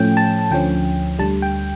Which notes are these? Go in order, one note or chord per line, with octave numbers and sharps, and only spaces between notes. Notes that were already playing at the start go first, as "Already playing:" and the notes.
Already playing: A2 F3 A3 C#4 G5
A5
D2 D3 F3 C#4 G5
D2 D3 G3 A5
G5